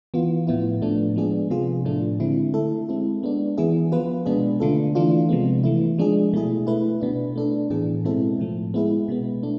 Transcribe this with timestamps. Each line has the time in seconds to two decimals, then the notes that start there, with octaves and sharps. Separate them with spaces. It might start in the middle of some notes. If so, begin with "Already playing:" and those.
0.14 E3 B3 F4
0.47 A2 F3 B3 E4
0.82 A2 F3 A3 D4
1.16 F3 G#3 B3 D4 G#4
1.50 C3 F3 B3 F4 G#4
1.85 A2 F3 A3 D4
2.20 D3 G#3 C4 E4
2.54 A3 E4 A4
2.89 G#3 C4 E4
3.23 G#3 B3 D4
3.57 E3 B3 E4 G#4
3.92 F3 B3 F4 B4
4.26 B2 G#3 B3 D4 G#4
4.60 D3 A3 D4 F4 A4
4.95 E3 A3 D4 F4
5.29 C3 F3 G#3 B3
5.63 E3 A3 E4
5.98 F3 G#3 D4 G#4
6.33 B2 A3 E4 G#4
6.67 A3 E4 B4
7.01 B2 B3 D4
7.36 A3 D4 A4
7.70 A2 E3 B3 D4 G#4
8.04 B2 G#3 C4 E4 A4
8.39 A2 F3 A3
8.74 G#3 B3 E4 G#4 B4
9.08 B2 G#3 B3
9.43 A3 D4